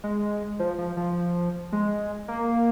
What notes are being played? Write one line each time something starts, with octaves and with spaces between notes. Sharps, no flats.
G#3
F3
F3
F3
G#3
A#3